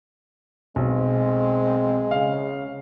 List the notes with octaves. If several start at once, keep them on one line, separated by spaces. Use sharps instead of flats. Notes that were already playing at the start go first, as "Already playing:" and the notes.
B1 G#3 C4
C#3 F5